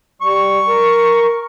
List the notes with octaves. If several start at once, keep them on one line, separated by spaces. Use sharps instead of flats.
G3 C#6
A#4